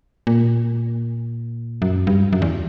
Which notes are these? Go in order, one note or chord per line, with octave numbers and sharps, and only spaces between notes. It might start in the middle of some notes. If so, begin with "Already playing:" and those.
A#2
F#2
G2
F#2
E2